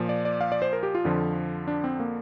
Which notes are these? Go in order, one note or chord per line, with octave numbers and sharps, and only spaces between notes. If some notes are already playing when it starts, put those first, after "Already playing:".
Already playing: A#2 F3
D5
D5
F5
D5
C5
A#4
G4
F4
F2 D3 F3
D4
C4
A#3